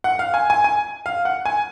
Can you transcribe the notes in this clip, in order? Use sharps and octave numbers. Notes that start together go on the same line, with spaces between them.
F#5
F5
G#5
G#5
G#5
F5
F#5
G#5